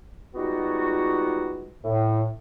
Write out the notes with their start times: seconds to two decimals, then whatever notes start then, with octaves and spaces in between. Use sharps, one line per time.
0.35 G3 G#3 B3 D#4 F4 F#4
1.84 A2